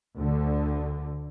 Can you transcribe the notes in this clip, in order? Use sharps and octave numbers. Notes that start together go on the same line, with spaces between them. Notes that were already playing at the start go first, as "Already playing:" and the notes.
D2 D3